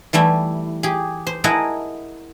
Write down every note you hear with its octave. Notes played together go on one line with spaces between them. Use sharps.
E3 G3 A3 E4
G4 G#4
C5
E4 G#4 A#4 D#5 F#5 A5